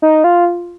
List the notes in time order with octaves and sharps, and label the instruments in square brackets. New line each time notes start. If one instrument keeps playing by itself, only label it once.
[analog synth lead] D#4
F4